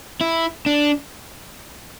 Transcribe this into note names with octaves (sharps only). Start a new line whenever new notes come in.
E4
D4